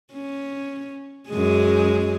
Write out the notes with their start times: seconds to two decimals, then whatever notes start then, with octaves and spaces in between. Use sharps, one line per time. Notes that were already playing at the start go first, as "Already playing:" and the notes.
0.13 C#4
1.30 F#2 G#3 G#4